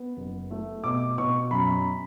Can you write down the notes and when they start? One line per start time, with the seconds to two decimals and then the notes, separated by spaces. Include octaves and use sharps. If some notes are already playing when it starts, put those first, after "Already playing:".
Already playing: B3
0.17 F#1
0.51 A3
0.84 B2 D6
1.18 B2 C#6
1.51 F#2 B5